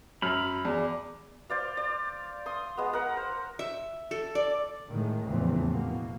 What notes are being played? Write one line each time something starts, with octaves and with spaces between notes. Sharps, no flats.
F#2 B5 F6
E2 D5 D6
C5 D5 F5
D5
C6 D#6
G#3 B3
A#4 F#5
C5
E5
A4
D5
A2 D#3 G#3
F1 E2 A2 C#3 E3 C4
B2 A#3